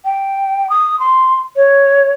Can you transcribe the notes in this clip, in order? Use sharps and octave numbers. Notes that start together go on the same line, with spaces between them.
G5
D#6
C6
C#5